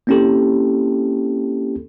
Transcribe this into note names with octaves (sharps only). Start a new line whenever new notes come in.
A#3 C4 C#4 E4 G4 A4